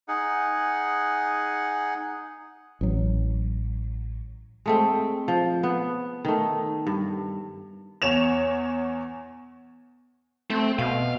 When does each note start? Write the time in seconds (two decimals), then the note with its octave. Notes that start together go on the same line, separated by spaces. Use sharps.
0.08 D#4 G#4 F#5
2.81 A1 F#3
4.66 G#3 A3 C4
5.28 F3
5.63 B3
6.25 D#3 A3
6.87 G2
8.02 E2 C#5 E7 F7
10.50 A3 C4
10.79 B2 F5